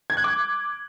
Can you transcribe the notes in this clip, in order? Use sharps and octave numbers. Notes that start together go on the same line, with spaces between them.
G#6
F#6
D6